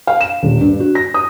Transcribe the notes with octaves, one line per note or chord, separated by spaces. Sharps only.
F5
E7
D#1
G2
F#4
A#6
D#6